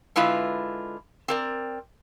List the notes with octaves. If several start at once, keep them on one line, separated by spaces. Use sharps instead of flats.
D3 G#3 E4 F4 B4 E5
C4 A#4 D5